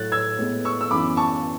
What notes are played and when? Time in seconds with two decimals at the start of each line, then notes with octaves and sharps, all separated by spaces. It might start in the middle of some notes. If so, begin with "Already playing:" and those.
Already playing: A2 F#3 A3 F#6 A6
0.12 E6 G#6
0.38 A2 G#3 B3
0.65 C#6 E6
0.81 E6
0.91 F#2 E3 B3 B5 D6
1.17 A5 C#6